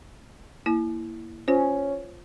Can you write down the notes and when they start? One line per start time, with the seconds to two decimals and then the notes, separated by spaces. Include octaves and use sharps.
0.66 A#3 E4
1.48 C#4 F4 C5